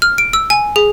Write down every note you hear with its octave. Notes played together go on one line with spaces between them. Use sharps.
F6
D7
E6
G#5
G#4